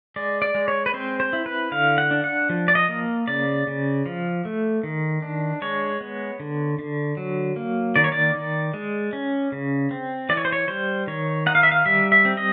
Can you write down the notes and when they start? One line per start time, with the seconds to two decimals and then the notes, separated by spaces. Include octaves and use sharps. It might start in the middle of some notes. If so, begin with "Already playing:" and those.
0.16 G#3 D5
0.42 D5
0.55 G#3
0.68 C#5
0.86 B4
0.94 C4 C5
1.20 C5
1.33 E4
1.46 B4
1.72 D3 F5
1.98 F#5
2.11 D4
2.24 F#5
2.50 F3
2.68 D5
2.75 D#5
2.89 A#3
3.28 C#3 D5
3.67 C#3
4.06 F3
4.45 A3
4.83 D#3
5.22 D4
5.62 G#3 C#5
6.01 B3
6.40 D3
6.79 D3
7.17 F#3
7.56 A#3
7.96 D#3 D5
8.04 C#5
8.12 D5
8.35 D#3
8.74 G#3
9.13 C#4
9.52 C#3
9.91 C4
10.29 E3 D5
10.37 C#5
10.45 C5
10.52 C#5
10.68 G3 C5
11.07 D#3 C#5
11.46 D#4 F#5
11.55 F5
11.63 E5
11.71 F5
11.86 G3 E5
12.12 E5
12.25 C4
12.37 D#5